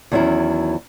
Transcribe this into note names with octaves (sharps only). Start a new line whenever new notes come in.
E2 D#3 F#3 C#4 E4